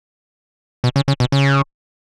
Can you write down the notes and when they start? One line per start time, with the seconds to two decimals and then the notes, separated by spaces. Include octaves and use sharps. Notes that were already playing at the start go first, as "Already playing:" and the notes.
0.84 B2
0.96 C#3
1.08 C#3
1.20 B2
1.32 C#3